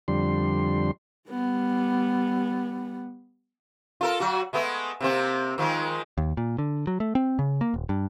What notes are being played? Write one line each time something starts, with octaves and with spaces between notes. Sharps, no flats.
F2 D3 G3 C6
G3 B3
F4 A4 A#4
F#3 F#4
G#3 A3 B3
C3 A#3 C4
D#3 F3 G#3
D#2
A#2
D3
F#3
A3
C4
C#3
A#3
D#1
G2